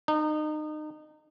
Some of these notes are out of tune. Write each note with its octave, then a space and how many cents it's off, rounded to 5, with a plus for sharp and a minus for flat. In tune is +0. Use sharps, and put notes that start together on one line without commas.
D#4 -30